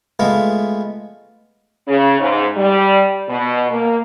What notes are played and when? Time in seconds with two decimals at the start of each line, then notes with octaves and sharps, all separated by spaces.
0.20 G#3 A3 B3 F4
1.88 C#3
2.20 G#2
2.57 G3
3.29 B2
3.70 A#3